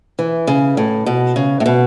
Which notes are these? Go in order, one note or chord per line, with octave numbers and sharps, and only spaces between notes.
E3
C#3
A2
B2
C#3
A2
B2